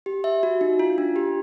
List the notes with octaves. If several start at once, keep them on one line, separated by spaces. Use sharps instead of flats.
G4
E5
F#4
D#4
F4
D4
G4